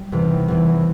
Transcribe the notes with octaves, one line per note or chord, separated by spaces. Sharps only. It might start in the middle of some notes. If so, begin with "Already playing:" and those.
Already playing: G3
E2 C3 E3
E2 C3 E3